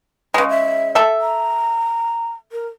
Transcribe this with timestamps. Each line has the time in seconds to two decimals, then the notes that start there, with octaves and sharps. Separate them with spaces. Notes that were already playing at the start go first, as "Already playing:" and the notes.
0.34 C#3 G#3 B4
0.49 E5
0.95 A4 E5
1.21 A#5
2.52 A#4